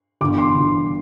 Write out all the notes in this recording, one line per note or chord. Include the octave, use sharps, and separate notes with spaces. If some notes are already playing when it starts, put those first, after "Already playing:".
G1 G2 E3 D6
C6
G1 G2 E3